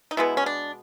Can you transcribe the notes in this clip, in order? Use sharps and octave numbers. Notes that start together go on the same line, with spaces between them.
D#4
B2 G#3 B3 E4
C#4
D4